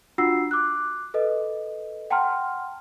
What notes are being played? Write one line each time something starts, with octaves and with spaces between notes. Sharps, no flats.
D4 F4 F#4 F#5 E6 C7
D6 F#6
A4 B4 D#5
F#5 G5 A5 A#5 C6 F6